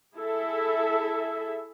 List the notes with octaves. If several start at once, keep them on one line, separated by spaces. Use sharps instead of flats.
E4 G#4 A4 E5